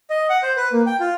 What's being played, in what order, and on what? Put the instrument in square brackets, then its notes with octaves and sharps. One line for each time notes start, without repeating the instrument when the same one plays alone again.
[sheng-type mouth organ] D#5
F#5
C5
B4
A#3
G5
F4